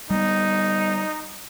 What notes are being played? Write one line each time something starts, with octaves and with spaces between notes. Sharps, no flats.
G3 B3 D#4